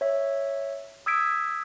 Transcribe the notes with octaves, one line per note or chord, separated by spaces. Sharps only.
C#5 E5
D#6 E6 G#6 B6 D7